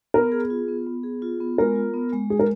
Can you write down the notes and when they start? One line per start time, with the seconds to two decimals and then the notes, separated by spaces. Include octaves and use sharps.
0.14 B3 A#4
0.32 G#4
0.50 F4
0.68 B3
0.87 B3
1.03 G#4
1.22 F4
1.40 B3
1.58 G#3 A#4
1.76 F4
1.94 B3
2.13 G#3
2.30 G#3 G#4
2.39 A#4